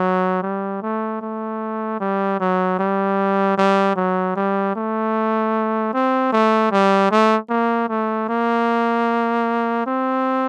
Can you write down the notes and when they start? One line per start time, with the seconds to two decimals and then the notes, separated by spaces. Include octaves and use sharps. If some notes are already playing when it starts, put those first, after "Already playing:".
Already playing: F#3
0.43 G3
0.82 A3
1.21 A3
2.00 G3
2.40 F#3
2.79 G3
3.58 G3
3.96 F#3
4.36 G3
4.76 A3
5.93 C4
6.32 A3
6.71 G3
7.11 A3
7.50 A#3
7.89 A3
8.29 A#3
9.86 C4